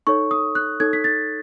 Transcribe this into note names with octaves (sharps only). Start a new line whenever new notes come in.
D#4 A4 C#5 C#6
D#6
F#6
D#4 A4 C#5 G#6
B6
A6